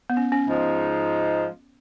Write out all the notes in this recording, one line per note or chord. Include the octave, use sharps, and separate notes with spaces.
B3
C#4
C#4
G#2 F3 G#3 D#4